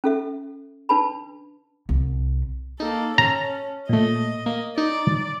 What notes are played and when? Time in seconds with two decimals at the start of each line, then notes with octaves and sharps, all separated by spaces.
0.04 C#4 A4 E5
0.89 D4 B4 A5 B5
1.89 C2
2.80 A#3 D#4 A4
3.18 C#4 A5 A#5
3.89 A#2 A3 D#5
4.46 A#3
4.78 D#4 D5